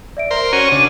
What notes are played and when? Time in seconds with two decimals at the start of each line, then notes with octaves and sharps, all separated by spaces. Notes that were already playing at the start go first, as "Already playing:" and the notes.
0.17 D5 E5 D7
0.31 A#4 C5 C6
0.53 C#4 F#4 C#5 D#7
0.72 C#3 D4